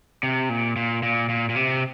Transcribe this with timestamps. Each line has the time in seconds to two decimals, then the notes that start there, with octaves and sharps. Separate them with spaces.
0.23 C3
0.49 A#2
0.76 A#2
1.03 A#2
1.29 A#2
1.49 A#2
1.56 C3